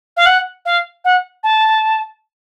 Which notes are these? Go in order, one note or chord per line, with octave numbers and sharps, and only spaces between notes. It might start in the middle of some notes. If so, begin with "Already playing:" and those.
F5
F#5
F5
F#5
A5